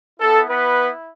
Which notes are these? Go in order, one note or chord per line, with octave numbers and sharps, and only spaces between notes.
B3 E4 A4
B3 B4